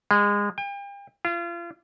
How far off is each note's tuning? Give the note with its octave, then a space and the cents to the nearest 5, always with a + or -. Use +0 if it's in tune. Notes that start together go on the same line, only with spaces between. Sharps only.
G#3 -25
G5 +40
F4 -35